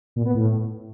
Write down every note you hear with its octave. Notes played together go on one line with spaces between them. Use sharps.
A#2
B3
A2